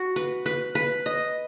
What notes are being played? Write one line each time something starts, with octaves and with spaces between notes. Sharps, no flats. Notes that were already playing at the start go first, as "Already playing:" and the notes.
Already playing: F#4
B4
B4
B4
D#5